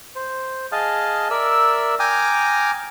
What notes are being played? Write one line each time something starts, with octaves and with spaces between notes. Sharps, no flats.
C5
G#4 D#5 F5 A5
A#4 D5 E5 E6
G5 G#5 A#5 D6 D#6 F6